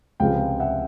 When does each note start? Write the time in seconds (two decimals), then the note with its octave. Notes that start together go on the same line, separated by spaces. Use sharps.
0.20 C#2 C3 F3 G#3 F5 G5
0.60 E5 F#5